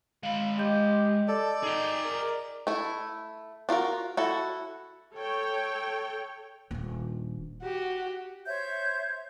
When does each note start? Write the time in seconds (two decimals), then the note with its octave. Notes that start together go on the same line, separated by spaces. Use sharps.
0.23 G#3 F5 B5
0.58 G4 D#5 G6
1.28 A4 D5
1.63 D#4 G#4 G5
2.04 A#4
2.67 A3 E4
3.69 D4 F4 F#4 A#4
4.17 E4 F#4 A4
5.16 A4 C#5 G5
6.71 D#1 D4
7.62 F#4 G4
8.46 C5 C#5 E5 G6